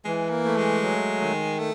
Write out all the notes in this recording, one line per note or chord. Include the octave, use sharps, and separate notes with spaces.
E3 G#3
A#3
A3
G#3
F#3
D#3
A3